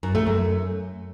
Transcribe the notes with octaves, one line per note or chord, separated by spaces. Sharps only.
F#2
A3
F#2